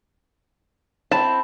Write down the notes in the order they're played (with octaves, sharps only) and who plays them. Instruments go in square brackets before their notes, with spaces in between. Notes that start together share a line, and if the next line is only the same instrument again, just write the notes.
[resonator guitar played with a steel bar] C4 E4 [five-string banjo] A5